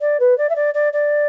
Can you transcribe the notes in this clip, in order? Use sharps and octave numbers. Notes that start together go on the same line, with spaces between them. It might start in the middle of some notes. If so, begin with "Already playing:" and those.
D5
B4
D5
E5
D5
D5
D5